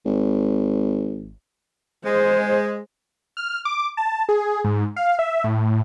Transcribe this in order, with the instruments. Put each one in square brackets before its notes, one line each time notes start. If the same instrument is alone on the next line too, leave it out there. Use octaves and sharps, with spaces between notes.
[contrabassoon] G#1
[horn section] G#3 [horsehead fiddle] C5
[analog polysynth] F6
D6
A5
G#4
G#2
F5
E5
A2